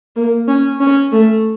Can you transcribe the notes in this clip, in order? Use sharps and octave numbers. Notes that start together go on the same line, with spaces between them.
A#3
C#4
C#4
A3